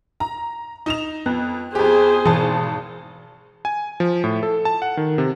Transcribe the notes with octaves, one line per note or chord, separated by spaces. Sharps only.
A#5
D#4 E7 F7
F2 B3 F#6
F2 G4 G#4 C5
G#1 B2 E3 A5 D#6
G#5
F3
A2
A4
A5
F#5
D#3
C3